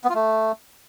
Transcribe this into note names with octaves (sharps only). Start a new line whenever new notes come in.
B3
F4
A3